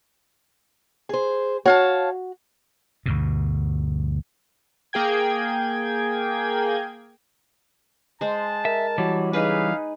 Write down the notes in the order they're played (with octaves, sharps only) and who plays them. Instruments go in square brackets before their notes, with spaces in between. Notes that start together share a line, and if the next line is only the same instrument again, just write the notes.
[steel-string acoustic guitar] G#4 C5
[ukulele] F#4 [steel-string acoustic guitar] C#5 F5 A5
[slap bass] D2 G2 B2
[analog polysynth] A#3 G#4 G5 G#6
[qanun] G#3 C5 [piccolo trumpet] A5
[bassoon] A#4 [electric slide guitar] E5
[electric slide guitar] E3 G3 [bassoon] F#3
[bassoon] C#3 [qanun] D#4 G#4 B4 [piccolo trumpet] F5